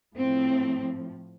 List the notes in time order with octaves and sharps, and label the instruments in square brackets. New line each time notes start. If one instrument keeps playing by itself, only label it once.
[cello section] A2 F3 C4